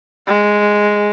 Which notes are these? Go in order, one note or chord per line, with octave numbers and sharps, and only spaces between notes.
G#3